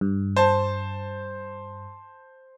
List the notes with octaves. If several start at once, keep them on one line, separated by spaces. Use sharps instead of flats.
G2
C5 A5